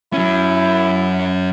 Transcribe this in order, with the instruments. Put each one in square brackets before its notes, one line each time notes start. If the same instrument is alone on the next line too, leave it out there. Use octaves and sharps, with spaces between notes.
[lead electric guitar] F#3 C#4 [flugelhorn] E4